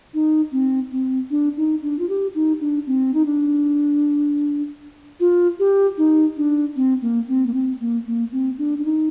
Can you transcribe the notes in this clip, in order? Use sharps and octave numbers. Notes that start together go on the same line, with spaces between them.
D#4
C4
C4
D4
D#4
D4
F4
G4
D#4
D4
C4
D#4
D4
F4
G4
D#4
D4
C4
A#3
C4
A#3
C4
A#3
A#3
C4
D4
D4
D#4